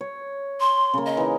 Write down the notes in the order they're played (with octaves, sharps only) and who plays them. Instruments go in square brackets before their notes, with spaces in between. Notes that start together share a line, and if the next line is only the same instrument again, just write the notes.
[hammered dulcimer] C#5
[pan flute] C6
[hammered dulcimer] C#3 A#3
[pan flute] D#5
[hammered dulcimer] E3 D#4